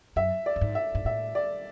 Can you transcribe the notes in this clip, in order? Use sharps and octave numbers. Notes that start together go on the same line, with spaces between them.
F#2 E5
D5
F#2
G#2
E5
G#2
A2 E5
D5